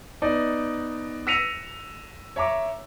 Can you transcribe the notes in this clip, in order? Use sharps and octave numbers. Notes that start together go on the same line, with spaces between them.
B3 D#4 D5 D#5
E6 A#6 B6 C#7 D#7 F7
C#5 E5 A#5 D6